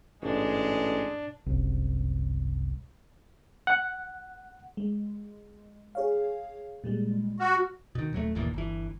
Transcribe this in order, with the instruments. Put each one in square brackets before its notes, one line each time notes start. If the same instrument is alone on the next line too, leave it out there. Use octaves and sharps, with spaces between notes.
[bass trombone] A1 [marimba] G#2 B2 [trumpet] G#3 [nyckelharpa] D4
[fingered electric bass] F#1 C2
[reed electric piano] F#5
[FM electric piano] G#3
G#4 C#5 F5
A#2 G3 G#3
[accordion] F#4 [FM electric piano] F6 F#6
[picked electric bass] B2 D#3
D#1 F#3 G3 A3
G1 D#2 A#2 E3
G1 E3